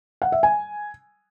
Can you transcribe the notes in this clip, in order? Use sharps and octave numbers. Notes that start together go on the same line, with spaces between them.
F#5
E5
G#5